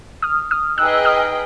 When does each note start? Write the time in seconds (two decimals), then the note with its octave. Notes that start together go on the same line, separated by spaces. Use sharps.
0.22 D#6 F6
0.51 D#6 F6
0.78 D#4 G#4 B4 D#5 G5 E6 F#6
1.05 D#6 F6